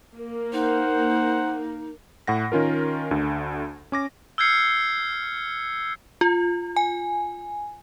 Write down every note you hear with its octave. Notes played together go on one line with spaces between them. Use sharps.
A#3
D#4 C5 F#5
A2 F#5 A#6
D#3 C#4 F4 A#4
D2 D3
C#4 D6 A#6
E6 F6 G6 G#6 C7 C#7
F4
G#5